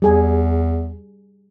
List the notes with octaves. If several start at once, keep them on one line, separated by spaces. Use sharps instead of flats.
E2 G3 G#4 G#5